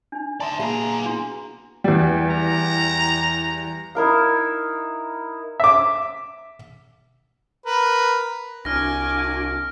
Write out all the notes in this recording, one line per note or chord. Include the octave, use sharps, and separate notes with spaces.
D4 D#4
D5 E5 A5 A#5 C6
A#2 B3 G#4 F5 A#5
D4 E4 F#4
E2 G3
A#5
D#4 E4 A#4 F5
E5 D6
A#4 B4
C2 D4 F#4 G#5 D6 F6 A#6